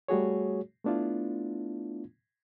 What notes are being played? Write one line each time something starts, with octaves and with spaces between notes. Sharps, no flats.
G3 A3 F#4 G#4 C#5
A3 B3 D4 E4 F4